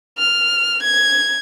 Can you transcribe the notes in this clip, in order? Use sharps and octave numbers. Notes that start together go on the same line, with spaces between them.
F6
G#6